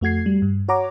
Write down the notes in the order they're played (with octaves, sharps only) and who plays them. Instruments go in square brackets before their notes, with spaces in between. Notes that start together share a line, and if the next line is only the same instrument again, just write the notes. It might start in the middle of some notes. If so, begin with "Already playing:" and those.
[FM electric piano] F2 A3 F#4 G#6 C7
G3
G2
F#4 C#5 F#5 A#5 D6